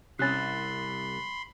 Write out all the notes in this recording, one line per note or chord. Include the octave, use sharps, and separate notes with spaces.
C2 C3 C#4 B5 C6 F#6 A6